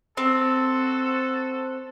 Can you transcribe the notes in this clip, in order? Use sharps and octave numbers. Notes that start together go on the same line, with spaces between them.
C4 F#4 A4